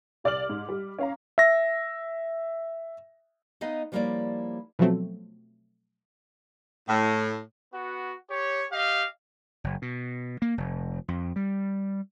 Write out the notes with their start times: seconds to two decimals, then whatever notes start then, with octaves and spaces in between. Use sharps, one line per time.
0.24 C2 D5 D6 F6 F#7
0.49 G#2
0.69 G3
0.99 C#4 F5 A#5
1.38 E5 A#6
3.61 B3 D#4 D#5 F5
3.92 F3 G3 A#3 E4 C#5 D5
4.79 B2 F3 F#3 A3 C4
6.89 A2
7.72 B3 F#4
8.29 G4 C#5
8.71 G4 D#5 F5
9.64 F#1
9.82 B2
10.42 A#3
10.58 F1
11.08 F2
11.36 G3